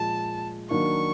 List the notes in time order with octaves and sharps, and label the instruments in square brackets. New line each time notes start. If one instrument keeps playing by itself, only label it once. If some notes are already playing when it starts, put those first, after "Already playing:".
Already playing: [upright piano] A#2 F3 G#3 [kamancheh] A5
[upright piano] D#3 F#3 A#3 D4 [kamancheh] C#6